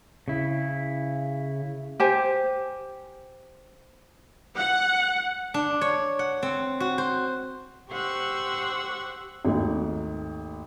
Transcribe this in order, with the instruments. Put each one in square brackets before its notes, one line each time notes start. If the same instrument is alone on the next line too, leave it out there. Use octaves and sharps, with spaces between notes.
[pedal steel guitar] C#3 E4
[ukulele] G4 C5 G#5
[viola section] F#5
[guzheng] D4
C#5
F#5
C4
F#4
C5
[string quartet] G4 C5 F#5 C#6 E6
[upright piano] G#1 D#2 A3 D#4